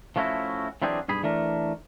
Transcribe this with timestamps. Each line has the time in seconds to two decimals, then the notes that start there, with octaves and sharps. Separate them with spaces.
0.16 F3 A3 C#4 E4 F#4
0.82 E3 F#3 C4 D4 G4 G#4
1.08 B1 G2 G#4 B5
1.23 E3 A3 D4 A#4